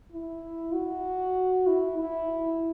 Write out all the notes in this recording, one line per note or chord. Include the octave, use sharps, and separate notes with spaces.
E4
F#4
E4
E4